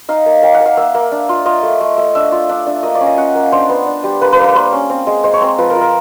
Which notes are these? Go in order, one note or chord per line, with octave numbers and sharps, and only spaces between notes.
D#4 F5
A#3
A#3 G5
F#5
A#3
F5
A#3 E5
A#3
D4
F4
F4 D#5
A3
A3
A3
D4 E5
F4
D4
D4
A#3 D#5
D5
C#4
D#5
C#4 F#5
A#3
D4 C5
B3
D4
G3
A#3 B4
B4
A#3
B4
A#3 C5
C#4
C4
G#3
G#3 C5
C#5
C4 C5
F3 B4
A#4
F4
A#4